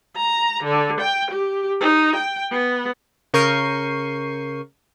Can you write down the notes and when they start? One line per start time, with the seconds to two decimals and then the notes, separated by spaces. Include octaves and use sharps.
0.16 A#5
0.64 D3
1.01 G5
1.31 G4
1.80 D#4
2.16 G5
2.51 B3
3.34 C#3 A#4 C#6 G6 C7 D#7